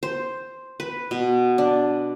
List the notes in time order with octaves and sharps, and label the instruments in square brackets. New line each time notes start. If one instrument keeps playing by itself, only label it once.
[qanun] C5
B4
B2
D4